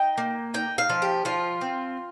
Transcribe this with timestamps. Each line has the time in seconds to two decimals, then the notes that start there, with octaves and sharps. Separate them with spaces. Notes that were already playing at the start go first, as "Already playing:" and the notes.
Already playing: D#4 G5
0.18 A#3
0.54 D#4 G5
0.78 F5
0.89 F3
1.02 G4
1.25 F3 F4
1.61 C4